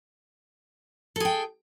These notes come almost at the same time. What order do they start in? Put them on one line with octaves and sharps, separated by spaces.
A4 G#4 G5